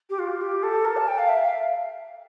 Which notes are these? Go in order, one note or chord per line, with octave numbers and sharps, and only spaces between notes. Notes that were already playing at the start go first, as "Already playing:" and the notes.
G4
F4
G4
A4
A#4
A5
G5
F5
E5
F5